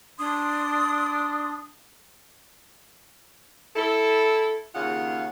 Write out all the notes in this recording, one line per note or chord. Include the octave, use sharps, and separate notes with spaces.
D4 C6 D#6
E4 A4
D#2 C#3 F4 G#4 F5 F#5